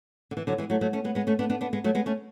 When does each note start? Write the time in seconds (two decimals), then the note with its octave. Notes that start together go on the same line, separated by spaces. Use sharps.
0.31 D3
0.37 E3
0.47 D3 F#3
0.58 E3 G#3
0.70 F#3 A3
0.81 F#3 A3
0.93 A3 C#4
1.04 G#3 B3
1.15 G#3 B3
1.27 A3 C#4
1.39 B3 D4
1.50 B3 D4
1.61 B3 D4
1.73 G#3 B3
1.84 F#3 A3
1.95 G#3 B3
2.06 A3 C#4